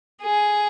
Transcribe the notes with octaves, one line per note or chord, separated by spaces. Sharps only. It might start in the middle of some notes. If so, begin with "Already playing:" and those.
G#4